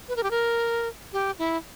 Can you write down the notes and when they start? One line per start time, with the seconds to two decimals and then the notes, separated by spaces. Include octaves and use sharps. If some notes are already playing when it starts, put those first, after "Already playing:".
0.09 B4
0.16 A#4
0.23 G4
0.31 A#4
1.13 G4
1.39 E4